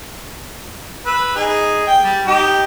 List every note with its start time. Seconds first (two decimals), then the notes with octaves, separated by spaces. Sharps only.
1.06 B4 E6
1.36 D#4 G#4
1.87 G5
2.03 G3
2.27 D#4 G4 G5